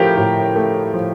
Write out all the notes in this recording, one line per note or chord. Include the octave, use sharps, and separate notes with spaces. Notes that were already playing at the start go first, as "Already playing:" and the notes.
Already playing: A2 F3 G4 A#4
A2
A3
F3